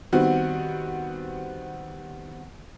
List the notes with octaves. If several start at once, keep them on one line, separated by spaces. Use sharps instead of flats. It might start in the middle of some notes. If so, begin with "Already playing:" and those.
D#3 G3 B3 C4 F#4